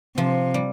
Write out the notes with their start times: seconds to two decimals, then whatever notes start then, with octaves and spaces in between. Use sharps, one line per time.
0.16 C3 F3
0.54 G3